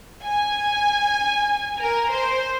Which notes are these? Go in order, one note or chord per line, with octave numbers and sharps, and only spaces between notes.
G#5
A#4
C5